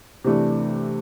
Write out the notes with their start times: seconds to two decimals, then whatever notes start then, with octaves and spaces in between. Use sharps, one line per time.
0.24 C3 E3 A3 D4